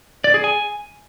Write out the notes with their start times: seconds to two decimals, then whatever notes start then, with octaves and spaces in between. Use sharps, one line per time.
0.24 D5
0.34 G#4
0.44 G#5